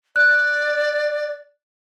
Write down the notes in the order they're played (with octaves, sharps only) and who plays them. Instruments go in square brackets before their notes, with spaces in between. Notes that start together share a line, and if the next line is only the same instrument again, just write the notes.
[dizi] D5 [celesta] F#6